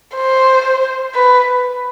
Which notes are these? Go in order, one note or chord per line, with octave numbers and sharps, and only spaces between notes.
C5
B4